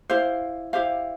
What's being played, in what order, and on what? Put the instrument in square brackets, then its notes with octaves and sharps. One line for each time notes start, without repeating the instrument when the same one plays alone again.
[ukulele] E4 G4 C5 F5
E4 G4 C5 F5